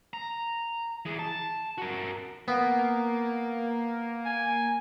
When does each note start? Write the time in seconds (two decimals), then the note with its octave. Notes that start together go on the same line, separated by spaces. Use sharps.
0.13 A#5
1.05 E3 G#4
1.19 A5
1.78 F#4 A#4
2.48 A#3 B3
4.25 G#5